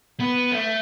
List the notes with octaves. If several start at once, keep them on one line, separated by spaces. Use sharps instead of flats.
B3
A3